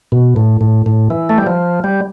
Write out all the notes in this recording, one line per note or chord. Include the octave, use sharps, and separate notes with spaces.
B2
A2
A2
A2
E3
A3
G3
F3
G3